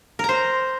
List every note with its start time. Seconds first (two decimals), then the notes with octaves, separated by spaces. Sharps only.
0.19 A#4
0.24 A#5
0.29 C5